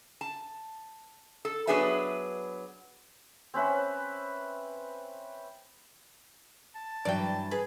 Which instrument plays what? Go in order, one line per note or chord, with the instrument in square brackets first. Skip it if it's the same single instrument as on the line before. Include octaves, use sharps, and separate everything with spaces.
[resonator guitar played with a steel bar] A5
A4
F#3 B3 D4 G#4 B4 E5
[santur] C4 C#4 B4 E5
[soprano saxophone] A5
[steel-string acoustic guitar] G2 E3 F#3 [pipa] D5 G5
[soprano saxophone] G#4 [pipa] B4